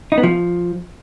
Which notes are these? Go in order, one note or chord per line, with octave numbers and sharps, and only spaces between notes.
D#4
B3
F3